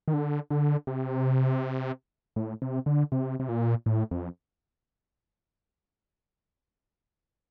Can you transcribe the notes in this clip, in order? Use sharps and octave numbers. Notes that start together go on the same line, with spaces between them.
D#3
D3
D3
C3
A2
C3
D3
C3
C3
A#2
A2
F2